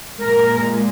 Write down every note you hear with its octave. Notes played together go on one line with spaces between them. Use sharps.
G#3 A#4
A#2